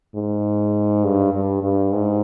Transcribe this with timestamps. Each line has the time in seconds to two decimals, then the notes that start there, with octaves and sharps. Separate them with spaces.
0.15 G#2
1.04 G2
1.34 G2
1.63 G2
1.93 G#2